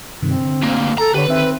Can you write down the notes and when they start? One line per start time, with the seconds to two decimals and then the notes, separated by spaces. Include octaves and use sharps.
0.22 G2 C3 D#3 C4
0.40 D3
0.63 D2 A#3
0.98 A4 A#5
1.14 D3 G4 B4 C#5
1.29 D#3 C4 E5